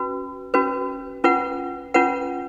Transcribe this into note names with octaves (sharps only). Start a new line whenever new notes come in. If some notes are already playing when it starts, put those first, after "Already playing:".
Already playing: C#4 F#4 B4
C#4 F#4 B4
C#4 F4 B4 F#5
C#4 F4 B4 F#5